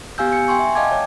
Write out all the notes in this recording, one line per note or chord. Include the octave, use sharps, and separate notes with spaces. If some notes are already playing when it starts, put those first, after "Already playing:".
B3 G4 F5 G#5 E6 G6
G#5 C#7
G5 G#5 C6 C#6
E5 G#5
D#5 F5 G5 A5 D6 G#6
C#5